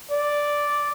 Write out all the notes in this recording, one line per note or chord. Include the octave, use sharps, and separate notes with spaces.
D5